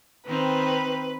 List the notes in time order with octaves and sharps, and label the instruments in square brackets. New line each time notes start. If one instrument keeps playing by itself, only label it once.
[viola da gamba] D#3 C4 [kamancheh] B4